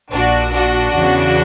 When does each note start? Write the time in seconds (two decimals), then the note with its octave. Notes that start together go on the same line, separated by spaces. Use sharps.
0.12 A#1 A#2 D4 F#4
0.53 D4 F#4
0.94 E2 C#3 E3